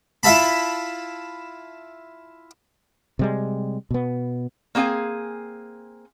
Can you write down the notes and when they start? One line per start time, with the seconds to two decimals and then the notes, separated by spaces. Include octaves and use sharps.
0.23 E4 F4 E5 A5 B5
3.19 C3 G3 G#3
3.91 B2 B3
4.75 A#3 C4 G#4 F5 G#5